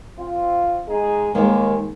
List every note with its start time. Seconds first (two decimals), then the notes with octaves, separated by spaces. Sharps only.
0.18 C4 F4
0.88 G#3 D#4 G#4
1.35 D#2 D#3 G#3 A#3